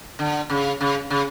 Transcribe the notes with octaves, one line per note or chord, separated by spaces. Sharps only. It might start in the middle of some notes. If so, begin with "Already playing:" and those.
D3
C#3
C#3
C#3